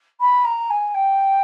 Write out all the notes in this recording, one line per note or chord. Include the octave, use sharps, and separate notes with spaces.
B5
A#5
G#5
G5